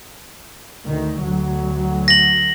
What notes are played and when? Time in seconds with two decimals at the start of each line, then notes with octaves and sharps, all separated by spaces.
0.87 D2 D#3
1.21 D2 F#3
2.08 A#6 F#7